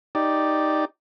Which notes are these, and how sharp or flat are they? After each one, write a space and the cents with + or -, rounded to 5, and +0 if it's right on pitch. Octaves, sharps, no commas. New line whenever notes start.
D#4 +0 G4 +0 D5 +0